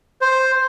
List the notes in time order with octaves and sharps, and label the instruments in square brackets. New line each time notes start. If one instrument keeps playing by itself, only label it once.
[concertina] C5